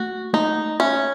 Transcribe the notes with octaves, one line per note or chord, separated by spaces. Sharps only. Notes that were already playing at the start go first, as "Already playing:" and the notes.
Already playing: A3 F#4
A3 D#4
C#4 E5